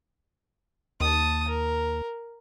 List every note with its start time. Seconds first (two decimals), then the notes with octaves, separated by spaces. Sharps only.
1.01 D#2 A5 D#6
1.48 A#4